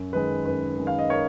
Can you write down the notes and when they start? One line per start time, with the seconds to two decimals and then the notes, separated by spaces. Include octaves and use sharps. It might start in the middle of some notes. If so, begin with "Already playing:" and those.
Already playing: F#2
0.12 D#3 G#3 B4
0.45 F#2 B4
0.77 D#3 G#3
0.87 F5
0.99 D#5
1.10 A#4 C#5